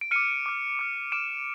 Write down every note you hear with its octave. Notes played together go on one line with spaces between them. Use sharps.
D7
D6 F6 C#7 D#7
D6 F6
D6 F6
D6 F6 D7 E7